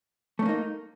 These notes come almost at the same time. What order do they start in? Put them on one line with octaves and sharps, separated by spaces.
A3 C#4 A#3 D#4